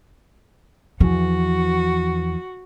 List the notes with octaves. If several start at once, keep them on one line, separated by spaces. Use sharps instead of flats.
E2 E3 F3 F#4